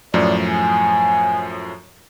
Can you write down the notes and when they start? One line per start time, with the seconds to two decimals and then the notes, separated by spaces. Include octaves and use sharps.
0.14 F#2 A2 F3 D5
0.48 G#5